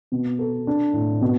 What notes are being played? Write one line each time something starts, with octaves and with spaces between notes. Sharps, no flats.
B2
A4
D4
A2
B2